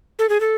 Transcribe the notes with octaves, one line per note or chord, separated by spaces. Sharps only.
A4
G#4
A4